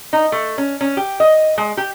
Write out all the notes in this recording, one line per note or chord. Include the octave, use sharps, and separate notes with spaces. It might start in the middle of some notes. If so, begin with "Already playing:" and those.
D#4
A3
C#4
C#4
G4
D#5
G#3
G4